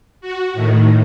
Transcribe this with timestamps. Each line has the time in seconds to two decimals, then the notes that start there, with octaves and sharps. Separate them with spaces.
0.21 F#4
0.54 A2 D#3